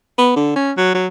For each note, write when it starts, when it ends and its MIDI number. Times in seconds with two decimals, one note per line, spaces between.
0.18 0.32 59
0.36 0.55 50
0.56 0.72 61
0.77 0.94 54
0.95 1.07 54